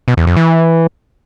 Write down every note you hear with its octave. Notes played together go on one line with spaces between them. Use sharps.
B2
E2
F2
E3